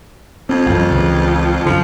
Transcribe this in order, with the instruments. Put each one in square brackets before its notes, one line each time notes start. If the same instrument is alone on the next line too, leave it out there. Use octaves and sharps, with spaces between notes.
[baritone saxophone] F2 [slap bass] C4
[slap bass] A1 F#2
C#2 C#3 E3
[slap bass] F#2 D3 [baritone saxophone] F3